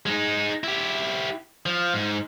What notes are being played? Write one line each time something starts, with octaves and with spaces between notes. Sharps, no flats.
G#3 D#4
E4 G4
F3
G#2